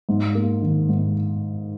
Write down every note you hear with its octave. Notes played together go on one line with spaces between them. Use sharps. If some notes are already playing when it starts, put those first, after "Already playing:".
G#2
A#3
D#3
G#2